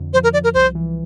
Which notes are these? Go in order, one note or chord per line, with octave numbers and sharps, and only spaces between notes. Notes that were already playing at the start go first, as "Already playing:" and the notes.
Already playing: F2 D3
F3 C5
A#4
F3 D5
A#4
C2 C5
E3